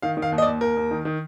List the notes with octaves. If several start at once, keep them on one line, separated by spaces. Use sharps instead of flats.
D#3 F5
D#3
F5
D#2
D#5
D5
D#2
D#2 A#4
D#2
D#3
D#3